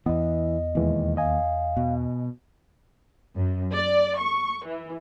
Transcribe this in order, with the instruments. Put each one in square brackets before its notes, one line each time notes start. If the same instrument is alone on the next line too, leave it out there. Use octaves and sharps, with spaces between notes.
[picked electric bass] E2 B3 [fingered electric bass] E3 [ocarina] D#5
[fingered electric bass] D#2 [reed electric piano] B2 E3 G#3
[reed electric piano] D#5 G#5 [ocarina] F5
[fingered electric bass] B2
[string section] F#2
D5
C#6
E3